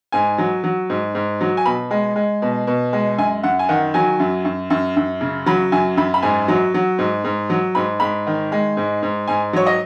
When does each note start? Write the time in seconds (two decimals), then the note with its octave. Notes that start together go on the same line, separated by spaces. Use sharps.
0.12 G#2 G#5
0.38 F#3
0.64 F#3
0.90 G#2
1.15 G#2
1.41 F#3
1.57 G#5
1.66 B2 B5
1.91 G#3
2.16 G#3
2.42 B2
2.67 B2
2.93 G#3
3.18 F#2 G#5
3.43 F#2 F#5
3.59 G#5
3.69 D#3 F#5
3.94 F#3 G#5
4.20 F#2
4.45 F#2
4.70 F#2
4.96 F#2
5.21 C#3
5.46 F#3 B5
5.72 F#2 G#5
5.97 F#2 B5
6.14 B5
6.23 G#2 G#5
6.48 F#3
6.74 F#3
6.99 G#2
7.24 G#2
7.50 F#3
7.75 G#2 B5
8.00 G#2 B5
8.27 D#3
8.52 G#3
8.77 G#2
9.03 G#2
9.28 G#2 G#5
9.53 F#3 C#5
9.66 D#5